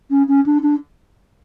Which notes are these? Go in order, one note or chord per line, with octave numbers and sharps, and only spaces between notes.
C#4
C#4
D4
D4